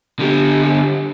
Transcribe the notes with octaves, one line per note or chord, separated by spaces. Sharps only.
D3 G4